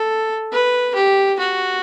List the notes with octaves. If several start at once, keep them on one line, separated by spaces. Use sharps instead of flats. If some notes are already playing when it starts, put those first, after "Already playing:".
Already playing: A4
B4
G4
F#4